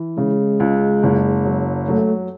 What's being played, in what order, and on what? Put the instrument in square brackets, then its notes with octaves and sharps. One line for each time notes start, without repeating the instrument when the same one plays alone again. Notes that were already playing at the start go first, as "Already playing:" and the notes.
Already playing: [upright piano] E3
[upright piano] C#3 [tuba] G#3
[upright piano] C#2
F#1
F#3
[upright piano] F#3 [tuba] A3